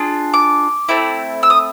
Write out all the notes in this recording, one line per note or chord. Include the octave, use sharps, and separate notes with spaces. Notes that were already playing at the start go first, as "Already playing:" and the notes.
Already playing: D4 F4 G#4
D6
A3 C4 E4
E6
D#6